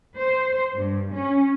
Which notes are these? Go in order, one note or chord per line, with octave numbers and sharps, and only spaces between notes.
C5
G2
C#4